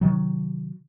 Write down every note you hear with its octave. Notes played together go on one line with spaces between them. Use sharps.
C3 D#3 F#3